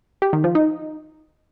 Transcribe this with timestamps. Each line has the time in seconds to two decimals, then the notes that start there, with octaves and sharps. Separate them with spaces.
0.22 G4
0.33 D#3
0.44 F3
0.55 D#4